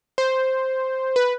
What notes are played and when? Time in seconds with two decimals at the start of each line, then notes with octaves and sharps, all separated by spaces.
0.18 C5
1.16 B4